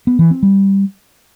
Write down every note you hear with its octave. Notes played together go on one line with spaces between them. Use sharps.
B3
E3
C4
G3